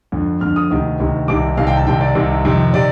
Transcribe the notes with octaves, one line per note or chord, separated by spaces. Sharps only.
F2 D3
F2 D3 F6
D#6
D2 C3 D#3
D2 C3 D#3
C2 C3 D#3 D6
C2 C3 D#3 F5
G5
A5
C2 C3 D#3 G5
D5
C2 C3 D#3
F2 C3 D#3
C3 D#3 D5